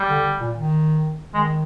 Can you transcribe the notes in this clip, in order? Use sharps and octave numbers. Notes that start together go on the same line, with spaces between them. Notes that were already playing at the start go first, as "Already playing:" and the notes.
Already playing: G3
D3
A#2
D#3
D#3 G#3